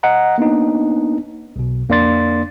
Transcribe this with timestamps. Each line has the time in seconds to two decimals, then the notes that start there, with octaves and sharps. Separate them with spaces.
0.03 D#5 F#5 A#5
0.38 A#3 B3 D4 D#4
1.56 B1 B2
1.89 F2 A#3 D4 D5 C6 A6